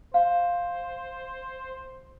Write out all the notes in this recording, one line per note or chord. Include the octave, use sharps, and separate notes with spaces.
C5 F5